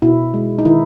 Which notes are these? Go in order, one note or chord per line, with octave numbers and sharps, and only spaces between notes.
B2 E4
G#3
D#4
D#3 E4